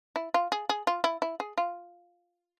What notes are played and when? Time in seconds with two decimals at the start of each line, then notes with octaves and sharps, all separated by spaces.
0.16 E4
0.34 F4
0.52 G#4
0.69 G#4
0.87 F4
1.04 E4
1.22 E4
1.40 G#4
1.58 F4